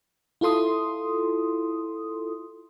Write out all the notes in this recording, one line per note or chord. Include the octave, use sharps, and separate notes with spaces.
E4 F4 A4 C6 D#6